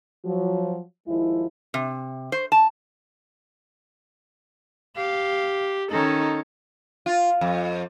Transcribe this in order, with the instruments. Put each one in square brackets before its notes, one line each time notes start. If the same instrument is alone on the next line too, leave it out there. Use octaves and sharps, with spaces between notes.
[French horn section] F3 F#3
D#2 F3 G#3 E4
[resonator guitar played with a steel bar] C3
C5
A5
[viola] G4 [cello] F5
[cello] D#3 C#4 [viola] D#4 A4
[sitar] F4
F2